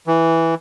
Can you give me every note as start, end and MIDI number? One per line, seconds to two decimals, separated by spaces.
0.07 0.55 52